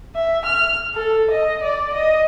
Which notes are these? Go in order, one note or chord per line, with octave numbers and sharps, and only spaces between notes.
E5
F6
A4
D#5
D5
D#5